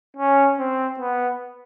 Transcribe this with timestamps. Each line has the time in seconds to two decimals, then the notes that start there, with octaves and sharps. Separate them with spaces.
0.17 C#4
0.59 C4
1.00 B3